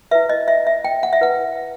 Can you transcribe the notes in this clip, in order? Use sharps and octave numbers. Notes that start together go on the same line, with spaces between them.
E4 B4 E5
D#5
E5
E5
G5
F#5
E5
E4 B4 F#5